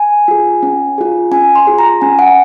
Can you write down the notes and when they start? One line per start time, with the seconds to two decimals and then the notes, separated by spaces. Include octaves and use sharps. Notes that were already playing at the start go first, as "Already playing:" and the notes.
Already playing: G#5
0.28 F4 G#4
0.63 C#4
0.98 F4 G#4
1.32 C#4 G#5
1.55 C6
1.67 F4 G#4
1.79 A#5
2.01 C#4 G#5
2.19 F#5